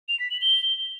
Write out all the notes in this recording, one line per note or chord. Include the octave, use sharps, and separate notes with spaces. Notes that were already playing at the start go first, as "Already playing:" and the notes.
F7
B6
F#7
G7